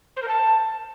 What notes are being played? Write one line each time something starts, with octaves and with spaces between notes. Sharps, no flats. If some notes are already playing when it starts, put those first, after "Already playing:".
C5
A#4
A5